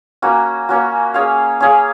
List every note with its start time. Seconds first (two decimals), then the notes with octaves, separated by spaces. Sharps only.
0.22 A#3 C#4 F#4
0.69 A#3 C#4 F#4
1.14 C#4 G#4 C#5 F5
1.60 C#4 G#4 C#5 F5